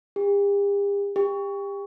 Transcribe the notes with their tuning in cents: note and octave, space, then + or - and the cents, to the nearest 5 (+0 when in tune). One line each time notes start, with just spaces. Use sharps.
G4 +45
G4 +30